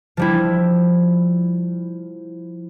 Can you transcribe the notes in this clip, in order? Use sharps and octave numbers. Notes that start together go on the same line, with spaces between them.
F3 G3 E4